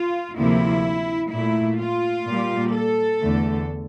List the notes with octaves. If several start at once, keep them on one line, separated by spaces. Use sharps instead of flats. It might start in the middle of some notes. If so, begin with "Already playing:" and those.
Already playing: F4
D2 C3 F3 A#3 E4
A#2 A3 E4
F4
A#2 G3 A#3
A4
E2 D3 A3